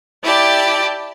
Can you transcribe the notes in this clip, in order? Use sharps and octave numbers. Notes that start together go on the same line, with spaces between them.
E4 G4 D5 A5 G6